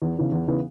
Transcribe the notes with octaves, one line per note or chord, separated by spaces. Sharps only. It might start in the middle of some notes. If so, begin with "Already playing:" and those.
E2
C#3 E3 B3
E2
C#3 E3 B3